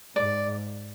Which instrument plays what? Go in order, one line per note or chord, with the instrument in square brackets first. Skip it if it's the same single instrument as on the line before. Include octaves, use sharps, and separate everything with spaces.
[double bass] G#2 [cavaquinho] D5